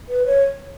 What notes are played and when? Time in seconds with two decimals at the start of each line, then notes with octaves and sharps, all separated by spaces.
0.09 B4
0.26 C#5